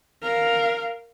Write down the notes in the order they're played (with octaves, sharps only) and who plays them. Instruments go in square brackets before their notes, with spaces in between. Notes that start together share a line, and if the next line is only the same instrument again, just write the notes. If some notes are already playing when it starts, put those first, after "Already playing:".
[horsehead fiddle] A#4 F5